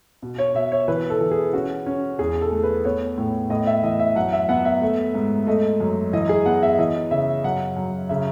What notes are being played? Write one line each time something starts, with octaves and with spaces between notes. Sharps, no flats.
B2
C#5
B2 E5
C#5
E3 B4
A4
E3
G#4
C#4 F#4
C#4
E2 G#4
A4
A3
B4
B3 C#5
A2
A2 D#5
E5
E3 D#5
E5
F#2 F#5
E5
B3 F#5
E5
A3
G#2
A3 D#5
F#2
E3 D#5
G#4
B3 F#5
E5
E3 D#5
C#3 E5
F#2 F#5
F#2
C#3 E5